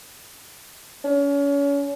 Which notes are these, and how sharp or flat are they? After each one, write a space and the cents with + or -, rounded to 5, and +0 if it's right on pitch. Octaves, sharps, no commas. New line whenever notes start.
C#4 +35